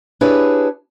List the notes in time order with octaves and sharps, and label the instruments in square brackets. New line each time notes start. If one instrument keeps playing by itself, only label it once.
[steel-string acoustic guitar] D4 E4 G4 G#4 B4 C#5